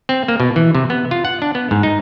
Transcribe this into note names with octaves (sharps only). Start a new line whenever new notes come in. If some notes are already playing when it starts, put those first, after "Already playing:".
C4
A#3
B2
E3
C3
B3
F4
F#5
D4
B3
G#2
D#4